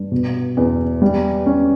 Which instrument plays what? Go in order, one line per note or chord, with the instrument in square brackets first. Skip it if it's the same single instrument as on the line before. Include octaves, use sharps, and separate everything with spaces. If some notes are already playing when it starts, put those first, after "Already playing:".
Already playing: [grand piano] G2
B2
E2
G3
C#4